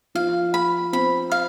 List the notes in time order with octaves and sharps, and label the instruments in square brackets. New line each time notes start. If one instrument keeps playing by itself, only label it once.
[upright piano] F3 [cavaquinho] F5
[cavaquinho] B5
[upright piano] C4 [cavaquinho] B5
[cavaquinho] F5